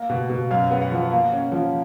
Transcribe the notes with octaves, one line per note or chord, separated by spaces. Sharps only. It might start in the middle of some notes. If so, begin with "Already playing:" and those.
Already playing: A#3
B2
B2
F#2 F5
B3
F#5
F3
A#3
C#4
F3